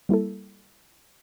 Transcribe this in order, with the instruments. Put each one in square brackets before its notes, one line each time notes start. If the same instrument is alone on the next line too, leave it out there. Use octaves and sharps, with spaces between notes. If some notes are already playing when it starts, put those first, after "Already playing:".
[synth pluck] G3 A#3 E4 A4